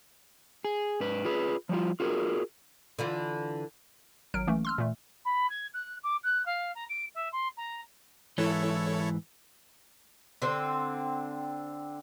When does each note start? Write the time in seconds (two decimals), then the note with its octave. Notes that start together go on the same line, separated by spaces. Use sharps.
0.64 G#4
1.00 G#2 B4
1.25 F4 G#4 B4
1.69 F3 G3 F4
2.00 F4 F#4 G#4 A#4
2.99 D3 E3 F4
4.34 G#1 F#3 F6 D7
4.47 E3 A3 A#3 C#4
4.65 C6 E6 F6
4.78 A#2 E3 A3
5.24 B5
5.49 G#6
5.73 F#6
6.03 D6
6.23 F#6
6.45 F5
6.75 A#5
6.89 D7
7.14 E5
7.32 C6
7.57 A#5
8.38 G#2 E3 E4 A4 C#5
10.42 D3 C4